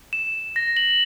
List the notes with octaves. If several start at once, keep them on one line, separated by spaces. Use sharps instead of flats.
E7
A#6
F#7